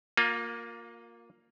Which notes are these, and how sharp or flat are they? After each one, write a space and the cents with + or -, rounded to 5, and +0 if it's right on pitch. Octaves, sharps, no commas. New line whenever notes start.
A#3 +0 F4 +30